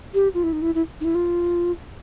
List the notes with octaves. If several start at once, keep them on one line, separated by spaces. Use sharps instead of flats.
G4
F4
E4
D#4
E4
E4
D#4
E4
F4